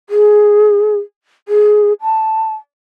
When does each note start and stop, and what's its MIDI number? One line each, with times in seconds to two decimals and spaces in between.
0.09 0.96 68
1.48 1.93 68
2.02 2.54 81